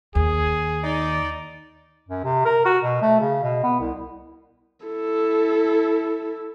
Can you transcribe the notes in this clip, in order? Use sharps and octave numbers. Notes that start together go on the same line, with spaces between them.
D#2 G#4
D#4 D5
F#2
C3
A#4
F#4
B2
A3
C#3
B2
B3
C2
E4 A4